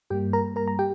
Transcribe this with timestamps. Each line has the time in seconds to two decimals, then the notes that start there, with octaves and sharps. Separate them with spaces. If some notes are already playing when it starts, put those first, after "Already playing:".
0.10 G2 G3 A#3 G4 G5
0.33 A#4 A#5
0.56 A#4 A#5
0.68 A#5
0.79 G4 G5